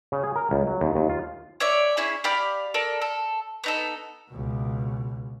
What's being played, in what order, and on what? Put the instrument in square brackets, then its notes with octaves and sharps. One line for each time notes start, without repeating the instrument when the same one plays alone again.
[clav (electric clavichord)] C#3
G#4
A#4
C#2
F#3
D#2
D#2
F4
[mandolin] C#5 D5 E5
C#4 E4 G#4
G4 D5 F5 B5
A4 A#4 D5
A4
B3 D#4 A4
[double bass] C#2 B2